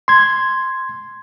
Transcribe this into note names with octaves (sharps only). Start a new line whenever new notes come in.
C6 G#6